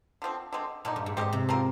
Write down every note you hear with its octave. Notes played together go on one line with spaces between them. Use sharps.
D3 F3 C4
D3 G#3 C4
A#2 D3 G#3 D#4
G2
G#2
G#2 C4 G4 A#4 D#5
C3
F3 C4 F4 A#4